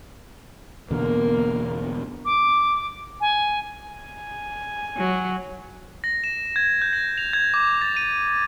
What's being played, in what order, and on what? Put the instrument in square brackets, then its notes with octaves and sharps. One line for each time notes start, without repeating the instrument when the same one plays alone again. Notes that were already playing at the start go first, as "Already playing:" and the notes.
[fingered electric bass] E2 B2 D3 [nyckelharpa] A#3 A#4
[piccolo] D6
G#5
[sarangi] G#5
[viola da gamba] F#3
[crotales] A#6
E7
G#6
G6
A#6
F7
G#6
D6
A6
D#7